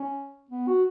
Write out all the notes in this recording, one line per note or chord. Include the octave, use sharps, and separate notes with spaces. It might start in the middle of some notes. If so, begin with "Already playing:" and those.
Already playing: C#4
B3
F#4